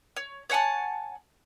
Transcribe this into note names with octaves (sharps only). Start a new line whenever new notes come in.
C#5
C#5 F#5 G#5 A5